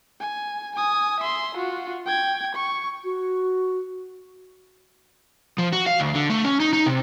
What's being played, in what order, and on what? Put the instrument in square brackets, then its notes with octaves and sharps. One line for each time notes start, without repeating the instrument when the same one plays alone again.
[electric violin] G#5
G#5 D#6
E5 C6
F4 F#4
G5 G#6
C#6
[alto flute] F#4
[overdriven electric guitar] F3
F#4
F5
D2
D3
A3
C#4
D#4
D#4
C3